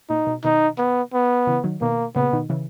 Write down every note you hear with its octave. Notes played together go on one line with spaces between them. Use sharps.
A#2 D#4
B2
B2 D#3 D#4
B3
B3
C#3 E3
D#3 F#3
B2 D#3 A#3
A#2 C#3 B3
B2 D#3
C#3 E3